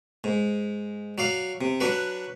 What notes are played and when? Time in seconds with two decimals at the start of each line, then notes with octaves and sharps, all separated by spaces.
0.24 G#2
1.18 F#3 D5 F5
1.61 C3
1.80 F#3 D4 F#4 B4